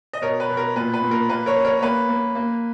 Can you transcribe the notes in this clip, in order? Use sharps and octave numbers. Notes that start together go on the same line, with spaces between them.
D#5
B2 A#4 C#5
B4
B2
A#4
A#2 B4
B4
A#2
A#4
A#3 B4
A#4 C#5
C#4
A#4 C#5
C#5
A#3 B4
A#3
A#3